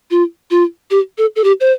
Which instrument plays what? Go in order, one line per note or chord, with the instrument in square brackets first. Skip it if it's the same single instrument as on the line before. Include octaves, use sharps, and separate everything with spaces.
[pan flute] F4
F4
G4
A4
A4
G4
C5